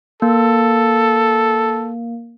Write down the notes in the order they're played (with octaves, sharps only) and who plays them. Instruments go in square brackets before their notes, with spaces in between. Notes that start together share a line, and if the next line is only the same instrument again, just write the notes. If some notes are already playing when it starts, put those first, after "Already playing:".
[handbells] A#3 [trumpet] A4